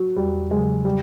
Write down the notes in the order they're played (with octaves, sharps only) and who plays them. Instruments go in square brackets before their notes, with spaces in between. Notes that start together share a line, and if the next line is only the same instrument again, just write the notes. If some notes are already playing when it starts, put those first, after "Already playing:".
Already playing: [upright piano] F#3
[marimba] E2 [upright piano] G3
[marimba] C#3 F#3 [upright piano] G#3
[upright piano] G3